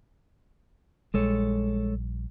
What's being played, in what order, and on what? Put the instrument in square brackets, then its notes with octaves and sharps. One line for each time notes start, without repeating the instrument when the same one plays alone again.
[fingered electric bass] A#1 G3 [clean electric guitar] G#3 A4 C#5